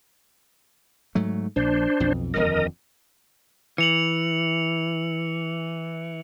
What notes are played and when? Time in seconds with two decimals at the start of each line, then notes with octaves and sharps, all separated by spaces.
1.15 G#2 F#3 A3
1.56 A#1 D4 C5
2.00 B1 F2
2.34 D#1 F2 D3 A#4 D#5
3.78 E3 C#7 F7 F#7